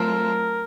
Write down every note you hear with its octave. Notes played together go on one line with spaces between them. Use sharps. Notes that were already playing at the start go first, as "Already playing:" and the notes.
Already playing: F#3 A3 C4 F4 A4 A#4